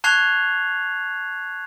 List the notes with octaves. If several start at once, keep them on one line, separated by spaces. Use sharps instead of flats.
A5 C#6 F#6 G#6 C7 F7